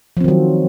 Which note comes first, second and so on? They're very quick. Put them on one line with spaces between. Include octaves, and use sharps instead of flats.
F3 C4 D#3 F#3